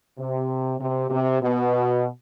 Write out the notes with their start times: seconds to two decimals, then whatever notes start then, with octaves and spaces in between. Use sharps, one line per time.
0.19 C3
0.79 C3
1.10 C3
1.41 B2